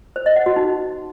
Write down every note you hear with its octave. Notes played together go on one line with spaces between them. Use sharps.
C5
D#5
F#5
F#4
D#4